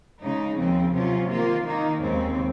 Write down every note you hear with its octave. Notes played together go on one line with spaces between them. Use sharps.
C#3 G#3 D#4
D#2 C#3 F3 C4
C3 F#3 C#4 F4
D#3 A#3 F4
D#3 A#3 D#4
D#2 C#3 G#3 C4